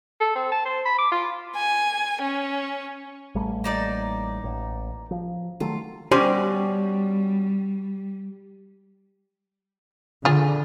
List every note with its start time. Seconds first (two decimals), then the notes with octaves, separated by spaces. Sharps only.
0.21 A4
0.35 C4
0.52 A5
0.65 C5
0.85 B5
0.98 D6
1.12 F4
1.56 G#5
2.22 C#4
3.35 A1 G3 A3
3.64 A#3 D#4 D5
4.44 A1
5.11 F3
5.60 D#3 F#3 A3 F4
6.11 B2 G3 C#4 G4 C5 D5 G#5 C6
10.25 D3 F4 G#4